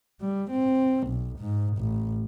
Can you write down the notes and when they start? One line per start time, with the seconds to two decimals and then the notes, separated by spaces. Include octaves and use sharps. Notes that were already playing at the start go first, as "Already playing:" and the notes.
0.21 G3
0.51 C4
1.08 B1
1.39 G#2
1.78 A1